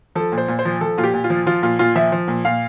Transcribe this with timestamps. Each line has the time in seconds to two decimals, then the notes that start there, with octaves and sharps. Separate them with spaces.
0.15 F3 A4
0.32 A#2
0.38 C5
0.48 A#2
0.59 C5
0.65 F3
0.81 F3 A4
0.98 A#2 F4
1.04 G4
1.14 A#2
1.24 F4
1.30 F3
1.47 F3 F4
1.63 A#2 F4
1.79 A#2 F4
1.96 F3 E5
2.12 F3
2.28 A#2
2.45 A#2 F5